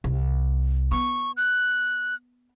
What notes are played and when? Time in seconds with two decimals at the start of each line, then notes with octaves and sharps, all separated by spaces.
0.04 C2
0.91 B3 C#6
1.37 F#6